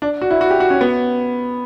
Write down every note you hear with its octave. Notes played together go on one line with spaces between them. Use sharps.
D4
F#4
E4
F#4
G4
F#4
C#4
B3